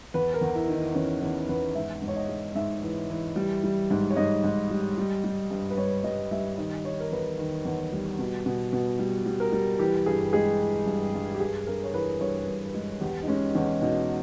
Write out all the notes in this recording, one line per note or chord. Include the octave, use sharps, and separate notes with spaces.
E2 B4
A#4
E2
E4
D#3
D#4
E2 C#4
E2 E4
E2 B4
G#2 E5
G#2
C#5
D#5
G#3
G#2 E5
E3
E3
G3
G3
G#2
C#5
G#2 D#5
G#2
G3
G3
G3
G2
B4
G2 C#5
G3 D#5
G3 E5
D#3 D#5
D#3 C#5
A#4
E2 B4
D#3
E2
G3
B2
B2
B2
G3
G3
A#4
G3
E3 G4
G2 G#4
G#3 G#4
E3
G2
G2
G4
G2 G#4
G2 A#4
C#5
E3 B4
G2 C#5
G2
G#3
E2 G4
D#4
G#3 C#4
E2 C#4
B2 D#4